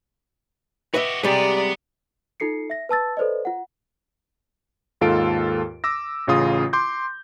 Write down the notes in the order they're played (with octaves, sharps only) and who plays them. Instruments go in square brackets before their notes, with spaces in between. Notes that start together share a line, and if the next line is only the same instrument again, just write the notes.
[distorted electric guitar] F#4 G4 [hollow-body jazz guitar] B4 D#5 E5
[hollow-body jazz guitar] C3 G3 G#3 [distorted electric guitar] B3 [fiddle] D5 A#5
[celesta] D#4 F4 A4 C7 C#7
E5 A#6
B4 A5 E6 A6
A4 B4 C5 D5 D#5
F4 F#5
[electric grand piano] D#2 G#2 F4 A4 D7
D6 E6 A#6
A1 C#3 F4 D#6
C6 D6 G6